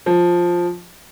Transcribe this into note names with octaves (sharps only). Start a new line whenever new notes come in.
F3